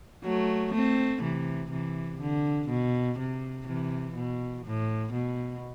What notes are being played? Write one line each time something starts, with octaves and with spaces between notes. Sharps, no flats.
F#3 A3
A3 C4
C3 E3
C3 E3
D3
B2
C3
C3 E3
B2
A2
B2